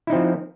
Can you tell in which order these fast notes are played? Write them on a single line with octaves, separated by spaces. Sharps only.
E4 D#4 C4 F3